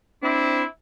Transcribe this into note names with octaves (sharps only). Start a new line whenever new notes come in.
C4 D4 E4